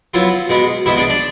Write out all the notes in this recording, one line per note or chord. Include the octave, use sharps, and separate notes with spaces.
F#3 B3 E4 F4 F5
B2 G#3 B3
B2 G#3 B3 E4 E5
D4 D5
D4 D5